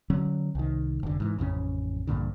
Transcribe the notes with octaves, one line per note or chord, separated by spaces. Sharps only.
D3 F#3 C#4
C2 D#3
F1 D3
G#2 E3
A1 F2 C#3 C#4
A#1 G2 A#2 D3